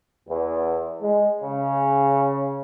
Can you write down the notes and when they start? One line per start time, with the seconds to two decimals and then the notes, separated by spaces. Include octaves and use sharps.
0.29 E2
1.00 G#3
1.42 C#3